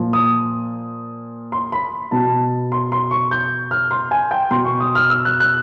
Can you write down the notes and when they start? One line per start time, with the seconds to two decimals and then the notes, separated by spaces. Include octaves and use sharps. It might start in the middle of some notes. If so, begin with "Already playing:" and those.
Already playing: A#2 F3
0.13 D#6
1.52 C6
1.72 B5
2.11 B2 A5
2.72 C6
2.92 C6
3.11 C#6
3.31 G6
3.71 F6
3.91 C6
4.11 G#5
4.31 G5
4.51 B2 C6
4.65 C#6
4.80 D#6
4.95 F6
5.10 E6
5.25 F#6
5.40 F#6